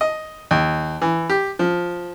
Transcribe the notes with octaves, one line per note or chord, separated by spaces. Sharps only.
D#5
D#2
E3
G4
F3